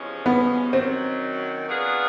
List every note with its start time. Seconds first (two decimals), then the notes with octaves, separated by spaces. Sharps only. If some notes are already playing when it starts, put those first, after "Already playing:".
Already playing: E2 C3 F3 G#3 C#4
0.26 B3
0.73 F#2 D#3 F#3 C4
1.68 F#3 B3 D4 F4 G#4